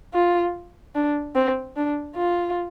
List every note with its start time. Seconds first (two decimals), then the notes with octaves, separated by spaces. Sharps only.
0.14 F4
0.95 D4
1.35 C4
1.77 D4
2.17 F4